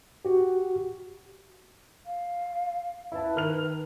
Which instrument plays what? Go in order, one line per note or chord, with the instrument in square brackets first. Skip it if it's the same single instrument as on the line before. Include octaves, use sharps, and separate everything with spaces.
[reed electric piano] F#4 G4
[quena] F5
[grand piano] E4 A5 [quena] B4
[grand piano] D#3 F6 F7